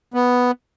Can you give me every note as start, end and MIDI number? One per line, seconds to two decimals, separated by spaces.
0.14 0.51 59